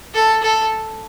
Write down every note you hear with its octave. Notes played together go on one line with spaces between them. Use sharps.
A4
A4